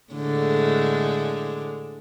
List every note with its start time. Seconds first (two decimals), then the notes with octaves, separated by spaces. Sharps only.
0.13 A2 D3 G#3